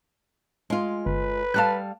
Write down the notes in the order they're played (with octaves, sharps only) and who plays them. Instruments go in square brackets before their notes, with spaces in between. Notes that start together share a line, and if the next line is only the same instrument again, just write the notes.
[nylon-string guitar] G#3 F4
[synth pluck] G1 [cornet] B4
[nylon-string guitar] G3 A4 F5 [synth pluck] A5 F#6